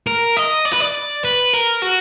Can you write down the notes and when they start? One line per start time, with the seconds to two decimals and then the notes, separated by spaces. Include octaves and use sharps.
0.07 A#4
0.37 D#5
0.65 D5
0.73 B4
0.80 D5
1.24 B4
1.53 A#4
1.82 F#4